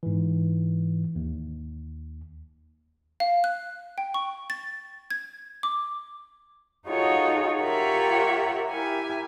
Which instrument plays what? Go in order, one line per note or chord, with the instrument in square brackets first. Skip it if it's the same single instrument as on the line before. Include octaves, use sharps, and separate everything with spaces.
[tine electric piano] G#2 E3
D#2
[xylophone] F5
F#6
G5
C#6
A6
G#6
D6
[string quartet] D#4 F4 F#4 G#4 A4 C#5
F4 G4 A#4 C#5 E5 F#5
E4 G4 A#4 E5 G#5